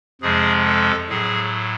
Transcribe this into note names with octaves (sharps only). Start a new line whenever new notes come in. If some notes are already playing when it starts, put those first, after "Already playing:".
F2 C3 F3 G#3 G#4
A4
A2 F#3 G#4